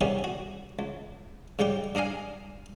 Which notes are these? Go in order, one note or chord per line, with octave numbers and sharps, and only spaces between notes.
C3 D#3 G3 B3 C#4 G#4
F#4
C#2
G#2 C#3 G3 G4 G5
G2 D4 D#5 F5 G#5